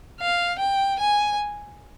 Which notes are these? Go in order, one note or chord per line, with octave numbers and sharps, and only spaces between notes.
F5
G5
G#5